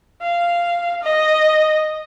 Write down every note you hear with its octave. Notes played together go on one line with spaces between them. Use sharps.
F5
D#5